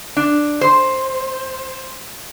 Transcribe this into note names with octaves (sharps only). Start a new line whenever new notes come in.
D4
C5